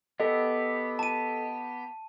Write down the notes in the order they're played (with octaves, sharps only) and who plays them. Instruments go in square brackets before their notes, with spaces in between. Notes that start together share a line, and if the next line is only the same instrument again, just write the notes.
[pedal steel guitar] B3 G4 [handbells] A4 D#5
[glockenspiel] A5 D#7